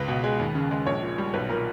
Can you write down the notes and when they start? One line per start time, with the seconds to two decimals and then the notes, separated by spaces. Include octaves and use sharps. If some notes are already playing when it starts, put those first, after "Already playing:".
Already playing: C#2 B4
0.08 B2
0.24 G#3
0.39 D#2
0.55 C#3
0.71 G#3
0.86 A#1 C#5
1.03 A#2
1.18 G3
1.34 B1 B4
1.50 A#2 A#4